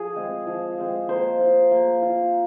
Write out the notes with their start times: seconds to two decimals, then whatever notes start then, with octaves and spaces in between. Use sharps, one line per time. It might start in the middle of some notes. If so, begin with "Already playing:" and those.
Already playing: F3 G#4
0.16 G#3 C4
0.47 F3
0.79 G#3 C4
1.09 A#3 C5
1.41 F4
1.71 A#3
2.02 F4